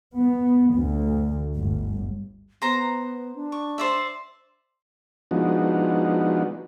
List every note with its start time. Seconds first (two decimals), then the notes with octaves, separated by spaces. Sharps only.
0.16 B3
0.75 D2
1.56 G1
2.62 B3 C5 A#5
3.36 D4
3.52 C#6
3.78 C5 D5 E5
5.31 F3 G#3 B3 D4 D#4 F#4